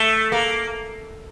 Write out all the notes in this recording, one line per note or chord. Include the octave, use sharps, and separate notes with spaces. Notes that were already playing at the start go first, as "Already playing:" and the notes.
Already playing: A3
A#3